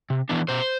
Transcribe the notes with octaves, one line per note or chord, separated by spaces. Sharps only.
C3
E3 B3 D4
B2 C5